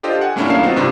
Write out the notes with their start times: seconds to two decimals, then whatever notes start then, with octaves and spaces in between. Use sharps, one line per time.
0.03 D4 F4 G4 A4 C5 D#5
0.21 F#5 G#5
0.36 G2 A3 A#3 C#4 D4 E4
0.49 B1 A#3 F5 C7 E7
0.63 D#3 B3 C4 D#4 F4 F#4
0.76 G2 C3 B3 D4 F4